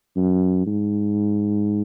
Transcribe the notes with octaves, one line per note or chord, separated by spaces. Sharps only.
F#2
G#2